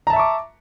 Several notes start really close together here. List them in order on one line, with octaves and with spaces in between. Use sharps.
A#5 A5 E5 C#6 D6